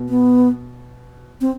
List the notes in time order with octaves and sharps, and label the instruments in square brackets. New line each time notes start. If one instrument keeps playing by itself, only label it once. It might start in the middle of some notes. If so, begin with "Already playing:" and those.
Already playing: [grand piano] B2
[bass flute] B3
C4